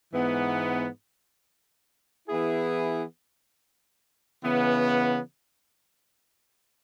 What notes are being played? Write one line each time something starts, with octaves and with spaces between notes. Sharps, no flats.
G#2 E3 B3
E3 B3 E4 G#4
C#3 E3 B3